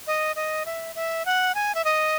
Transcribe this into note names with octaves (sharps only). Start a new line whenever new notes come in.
D#5
D#5
E5
E5
F#5
G#5
E5
D#5